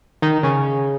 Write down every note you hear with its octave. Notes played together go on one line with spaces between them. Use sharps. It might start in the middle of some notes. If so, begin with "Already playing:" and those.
D#3 D#4
C#3 C#4